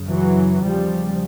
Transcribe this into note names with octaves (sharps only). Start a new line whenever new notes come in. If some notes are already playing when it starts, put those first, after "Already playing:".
Already playing: F#2 C#3
E3 F#3
E2 C#3 F3 G3